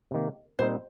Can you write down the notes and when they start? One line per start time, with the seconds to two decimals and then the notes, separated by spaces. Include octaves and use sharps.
0.11 C3 D#3 A#3
0.59 A#2 G3 C4 D#4 C5